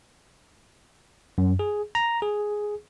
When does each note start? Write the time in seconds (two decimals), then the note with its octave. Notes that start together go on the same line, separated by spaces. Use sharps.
1.38 F#2
1.59 G#4
1.95 A#5
2.22 G#4